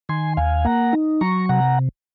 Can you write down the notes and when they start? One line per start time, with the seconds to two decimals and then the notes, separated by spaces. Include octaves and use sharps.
0.09 D#3 G#5 C6
0.37 D#2 F5 G#5
0.65 A#3 F#5 A#5
0.93 D#4
1.21 F#3 A#5 C#6
1.49 C3 F#5 A#5